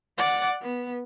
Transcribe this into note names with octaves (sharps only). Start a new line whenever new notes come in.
D5 F#5
B3